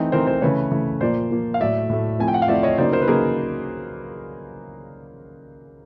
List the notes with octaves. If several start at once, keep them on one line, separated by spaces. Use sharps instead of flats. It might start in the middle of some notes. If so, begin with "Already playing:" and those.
Already playing: E3 A3 C4 D#4
E3 A3 C4 D#4 A#4 C5
A#4 C5
C#3 E3 A3 B4 C#5
C#3 E3 A3
A#2 F3 A#3 C5 D5
A#2 F3 A#3
F5
A2 F#3 A3 D5 E5
A2 F#3 A3
F3 A3 C4 E4 G#5
G5
F#5
F5
F3 A3 C4 E4 D5 E5
C#5 D#5
C#3 F#3 A#3 D#4 C5 D5
A#4 C5
B4
C#3 F#3 A#3 D#4 G#4 A#4